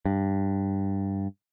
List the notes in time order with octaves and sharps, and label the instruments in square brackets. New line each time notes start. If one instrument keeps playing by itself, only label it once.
[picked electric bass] G2